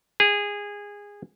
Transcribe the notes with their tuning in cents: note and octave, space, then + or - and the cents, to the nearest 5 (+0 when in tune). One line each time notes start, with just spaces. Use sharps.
G#4 -20